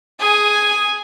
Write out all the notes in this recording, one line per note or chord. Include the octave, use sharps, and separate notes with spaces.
G#4 G#5